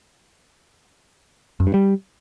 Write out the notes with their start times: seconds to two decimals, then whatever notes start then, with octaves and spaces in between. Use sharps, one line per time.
1.60 F#2
1.67 G2
1.74 G3